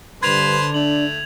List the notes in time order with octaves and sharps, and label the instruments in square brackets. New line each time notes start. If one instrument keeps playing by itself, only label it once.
[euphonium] G2 [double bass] D3 [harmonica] B4 C5 C6 [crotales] G#6 F7
[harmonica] A3 [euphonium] D4 [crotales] F#7